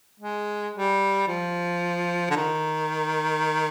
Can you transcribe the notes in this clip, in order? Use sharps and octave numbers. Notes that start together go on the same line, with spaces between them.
G#3
G3
F3
D3
D#3